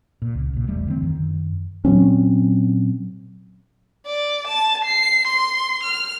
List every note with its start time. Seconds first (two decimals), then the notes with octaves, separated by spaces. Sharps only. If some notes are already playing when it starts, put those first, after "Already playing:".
0.22 A#2
0.35 C#2
0.53 B1 A#2
0.67 E1 E2 G3 A3
0.87 D3 E3 A#3 C4
1.02 F#2 D#3
1.85 A#2 F#3 C4 C#4
4.06 D5
4.47 A5
4.85 C7
5.28 C6
5.84 F6